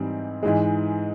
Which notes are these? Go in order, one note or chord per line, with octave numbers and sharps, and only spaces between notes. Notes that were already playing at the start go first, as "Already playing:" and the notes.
Already playing: G#2 E3 G3 C4 E4
G#2 E3 G#3